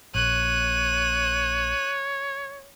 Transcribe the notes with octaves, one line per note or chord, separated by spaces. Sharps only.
A#1 A#2 C#5 F#6 D#7